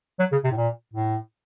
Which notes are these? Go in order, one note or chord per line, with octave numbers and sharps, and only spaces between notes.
F#3
C#3
C3
A2
A#2
A2